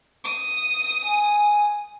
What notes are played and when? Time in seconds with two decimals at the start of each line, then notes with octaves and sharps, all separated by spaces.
0.24 D#6
1.05 G#5